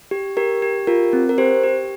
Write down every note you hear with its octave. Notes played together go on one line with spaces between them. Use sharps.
G4
G4 A#4
G4
F4 A#4
C4
A#4
G4 C5
G4